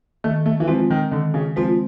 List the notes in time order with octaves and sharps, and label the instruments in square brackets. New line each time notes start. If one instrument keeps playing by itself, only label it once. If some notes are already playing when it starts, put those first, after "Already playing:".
[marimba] D#3 [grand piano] A3
[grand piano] A3
E3
[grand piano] F3 [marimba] G#3 C4
[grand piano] D#3
[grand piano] D3 [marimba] D#3
[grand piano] C#3
[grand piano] F3 [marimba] G#3 C4